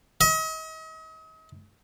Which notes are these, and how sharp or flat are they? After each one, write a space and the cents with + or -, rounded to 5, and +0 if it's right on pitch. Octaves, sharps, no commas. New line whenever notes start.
D#5 +40